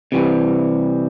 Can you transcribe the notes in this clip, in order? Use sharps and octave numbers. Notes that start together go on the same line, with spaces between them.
C3 E3 G3 C4